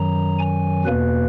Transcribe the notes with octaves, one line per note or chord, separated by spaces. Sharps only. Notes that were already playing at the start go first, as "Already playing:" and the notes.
Already playing: F#2 D#3 F#3 A#5
G#5
E2 B2 A#3 B4